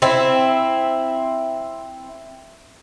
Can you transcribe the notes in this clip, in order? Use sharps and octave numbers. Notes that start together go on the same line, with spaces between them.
C4 E4